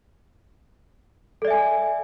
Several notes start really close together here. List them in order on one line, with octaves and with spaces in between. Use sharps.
A4 D5 E5 G#5